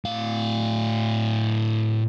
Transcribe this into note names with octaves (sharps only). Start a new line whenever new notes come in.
A2 F5